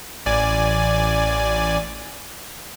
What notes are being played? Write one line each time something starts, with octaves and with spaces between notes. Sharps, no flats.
A1 D5 G#5